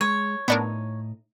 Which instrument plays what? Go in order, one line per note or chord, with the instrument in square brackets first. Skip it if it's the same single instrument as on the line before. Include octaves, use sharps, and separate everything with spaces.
[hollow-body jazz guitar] G#3 [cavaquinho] C#5
[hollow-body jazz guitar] A2 D#4 [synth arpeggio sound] B3 D4 A#4